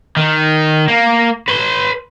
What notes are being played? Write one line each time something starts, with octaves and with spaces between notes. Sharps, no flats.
D#3
A#3
B4 C6